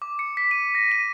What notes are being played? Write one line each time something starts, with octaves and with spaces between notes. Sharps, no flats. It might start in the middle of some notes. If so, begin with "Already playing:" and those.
D6
C#7
B6
D#7
A#6
D#7